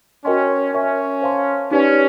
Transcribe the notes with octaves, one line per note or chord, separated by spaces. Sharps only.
C#4 F#4 A#4 D#5 G5 C6
C#4 A#4 C#5 E5 G#5 C#6
C5 F5 A5 C6
C#4 D#4 G4 B4 D5